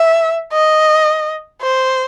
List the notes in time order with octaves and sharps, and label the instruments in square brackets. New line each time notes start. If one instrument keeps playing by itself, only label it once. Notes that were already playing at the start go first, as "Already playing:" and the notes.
Already playing: [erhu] E5
D#5
C5